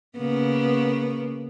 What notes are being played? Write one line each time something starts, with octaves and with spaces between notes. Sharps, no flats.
C#3 A#3 B3